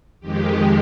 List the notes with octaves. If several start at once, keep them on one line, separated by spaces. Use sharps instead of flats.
F2 D#3 G#3 G4